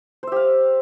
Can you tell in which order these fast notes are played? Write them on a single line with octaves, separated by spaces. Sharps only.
C5 E5 G4 F5